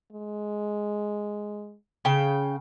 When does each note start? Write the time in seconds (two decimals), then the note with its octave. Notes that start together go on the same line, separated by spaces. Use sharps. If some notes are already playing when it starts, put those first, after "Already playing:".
0.12 G#3
2.05 C#3 G5